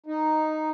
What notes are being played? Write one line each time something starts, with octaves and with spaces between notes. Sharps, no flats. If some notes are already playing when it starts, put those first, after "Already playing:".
D#4